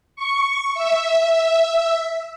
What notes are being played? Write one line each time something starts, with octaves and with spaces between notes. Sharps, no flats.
C#6
E5